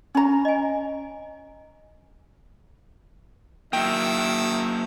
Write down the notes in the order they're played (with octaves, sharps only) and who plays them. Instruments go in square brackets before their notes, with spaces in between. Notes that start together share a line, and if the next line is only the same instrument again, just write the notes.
[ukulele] C#4 A#5
[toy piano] D#5 G#5
[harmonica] D#3 E5 E6 [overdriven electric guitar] F#3 A#3 [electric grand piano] G5